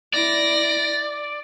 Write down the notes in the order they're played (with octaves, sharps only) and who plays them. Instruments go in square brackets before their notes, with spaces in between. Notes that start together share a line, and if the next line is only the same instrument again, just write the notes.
[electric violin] E4 A#6 [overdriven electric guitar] D5